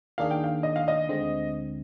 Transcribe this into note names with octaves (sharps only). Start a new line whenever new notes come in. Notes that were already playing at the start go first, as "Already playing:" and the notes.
D#2 D#3 A#3 D4 G#4 F5
G5
F5
D#5
F5
D#5
D2 D3 G#3 C4